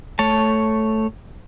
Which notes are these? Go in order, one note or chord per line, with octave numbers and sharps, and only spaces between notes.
A3 C#5 A5